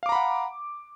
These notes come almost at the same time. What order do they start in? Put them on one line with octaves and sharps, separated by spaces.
F5 D6 A#5 B5 F#5